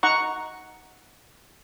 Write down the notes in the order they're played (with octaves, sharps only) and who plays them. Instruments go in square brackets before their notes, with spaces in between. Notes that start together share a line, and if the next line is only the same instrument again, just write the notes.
[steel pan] D#4 F#5 A#5 C#6